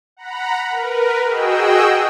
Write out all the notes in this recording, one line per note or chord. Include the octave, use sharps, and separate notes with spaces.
F#5 A#5 B5
A#4 B4
F#4 G#4 D#5 G5 E6